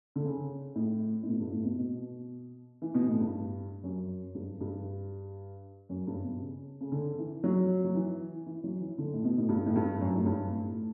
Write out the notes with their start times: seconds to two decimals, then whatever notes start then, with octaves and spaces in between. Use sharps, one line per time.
0.16 D3
0.24 C#3
0.75 A2
1.23 A2
1.27 B2
1.40 G2
1.52 A2
1.65 B2
1.79 B2
2.82 E3
2.95 B2
3.07 A2
3.20 G2
3.84 F#2
4.35 G2
4.61 G2
5.89 F#2
6.07 G2
6.24 B2
6.40 C#3
6.81 C#3
6.92 D3
7.18 E3
7.44 F#3
7.84 F#3
7.95 E3
8.46 E3
8.64 F#3
8.80 E3
8.98 D3
9.14 A2
9.24 B2
9.38 A2
9.49 G2
9.66 A2
9.76 G2
10.01 F#2
10.16 A2
10.26 G2
10.53 A2
10.70 A2